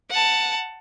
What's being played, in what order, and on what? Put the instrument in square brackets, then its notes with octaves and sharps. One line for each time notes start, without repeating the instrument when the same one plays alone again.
[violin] F#5 A5